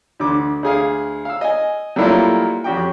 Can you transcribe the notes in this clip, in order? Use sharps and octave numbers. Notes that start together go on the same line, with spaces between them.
D2 D3 D6
D2 G#4 F5
F5 E6
D#5 G#5
F#3 G3 A3 A#3 E4 F4
F2 C#4 F#4 G4 G5